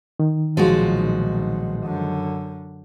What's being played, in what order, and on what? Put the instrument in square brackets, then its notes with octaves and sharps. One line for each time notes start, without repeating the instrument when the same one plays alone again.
[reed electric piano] D#3
[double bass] B1 A#2 [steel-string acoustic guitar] F3 G#3 F#4
[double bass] F#2 D3